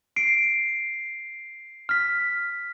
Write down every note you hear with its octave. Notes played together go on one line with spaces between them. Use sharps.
C7 D7
F6 B6